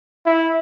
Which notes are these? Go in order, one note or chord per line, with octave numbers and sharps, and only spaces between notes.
E4